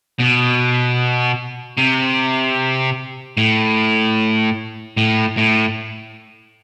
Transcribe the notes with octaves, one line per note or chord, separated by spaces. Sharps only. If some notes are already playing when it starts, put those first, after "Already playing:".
B2
C3
A2
A2
A2